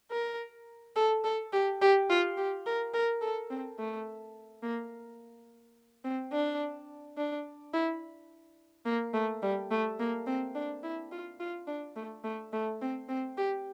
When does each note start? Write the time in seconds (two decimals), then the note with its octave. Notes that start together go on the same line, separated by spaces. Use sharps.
0.11 A#4
0.96 A4
1.24 A4
1.53 G4
1.81 G4
2.10 F4
2.37 G4
2.66 A#4
2.94 A#4
3.22 A4
3.50 C4
3.79 A3
4.63 A#3
6.04 C4
6.32 D4
7.17 D4
7.73 E4
8.85 A#3
9.13 A3
9.42 G3
9.71 A3
9.99 A#3
10.26 C4
10.55 D4
10.83 E4
11.12 F4
11.40 F4
11.67 D4
11.96 A3
12.24 A3
12.53 A3
12.81 C4
13.09 C4
13.37 G4